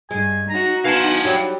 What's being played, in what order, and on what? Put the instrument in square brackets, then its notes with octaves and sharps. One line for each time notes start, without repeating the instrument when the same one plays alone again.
[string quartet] G2 [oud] G#3 [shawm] G#5
[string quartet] D#4 F#4 [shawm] A#5
[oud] B3 [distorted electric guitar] F5 A5 [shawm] G#5
[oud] F#3 G3 G4